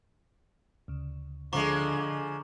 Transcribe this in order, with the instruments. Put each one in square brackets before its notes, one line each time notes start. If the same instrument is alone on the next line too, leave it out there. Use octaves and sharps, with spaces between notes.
[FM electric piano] D2 C#3
[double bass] D3 [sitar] F3 G#3 [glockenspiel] A#5 C#6 D6